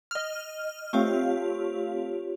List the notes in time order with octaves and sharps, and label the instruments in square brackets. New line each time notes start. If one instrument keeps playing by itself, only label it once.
[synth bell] D#5 F6
[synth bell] A3 C4 F5 [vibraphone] F4 G4 C#5